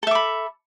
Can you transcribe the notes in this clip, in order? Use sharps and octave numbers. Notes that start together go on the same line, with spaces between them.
A4 E5 B5 D6